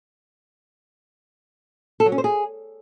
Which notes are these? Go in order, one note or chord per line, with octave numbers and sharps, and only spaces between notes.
A4
F#3
C#4
C5
G#4